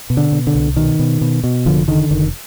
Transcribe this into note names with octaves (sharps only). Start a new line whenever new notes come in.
B2
D3
B2
D3
C2
B2 D#3
B2
B2
B2
F1 D3 F3
D3 D#3
F1 D#3